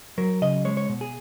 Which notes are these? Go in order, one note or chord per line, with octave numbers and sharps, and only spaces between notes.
F#3 A#4
C#3 D#5
G#3 C#5
C#5
B2
G#4